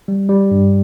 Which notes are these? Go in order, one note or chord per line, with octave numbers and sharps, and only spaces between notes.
G3
G3
G2